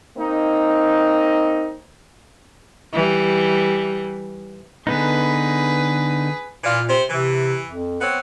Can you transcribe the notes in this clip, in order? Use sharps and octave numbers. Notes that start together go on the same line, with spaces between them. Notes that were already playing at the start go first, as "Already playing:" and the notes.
A#3 C4 D#4
E3 G3
D3 B3 D#4 G#4 B4
A#2 E3 F4 D5
C3 C5
C3 E3
F2
B3 C4 C#5